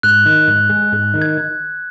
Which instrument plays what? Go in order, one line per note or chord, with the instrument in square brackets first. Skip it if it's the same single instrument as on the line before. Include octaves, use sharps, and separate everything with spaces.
[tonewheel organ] G#2 [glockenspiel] F#6
[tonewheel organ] D#3
G#2
G#3
G#2
D#3
[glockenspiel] G#6